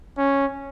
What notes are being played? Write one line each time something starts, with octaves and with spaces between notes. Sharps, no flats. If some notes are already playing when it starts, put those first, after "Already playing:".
C#4